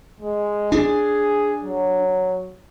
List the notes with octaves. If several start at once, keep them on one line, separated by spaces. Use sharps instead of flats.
G#3
D4 G#4
F#3